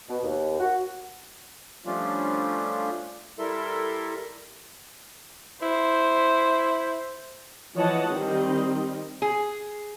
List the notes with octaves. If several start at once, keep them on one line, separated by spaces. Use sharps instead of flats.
B2
D#2
F#4
F3 G3 A3 C#4 D4 F4
G3 E4 A4 A#4 E5 C6
E4 C5
E3 F3 C#5 D#5 F#5 A5
D#3 G3 C4 D#5
G#4